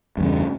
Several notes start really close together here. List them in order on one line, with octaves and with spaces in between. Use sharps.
G2 E2 C#3